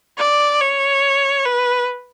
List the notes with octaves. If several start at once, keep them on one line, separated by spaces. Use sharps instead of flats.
D5
C#5
B4